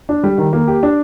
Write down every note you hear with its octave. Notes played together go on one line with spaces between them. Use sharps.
D4
G3
D#3
A#3
G4
D4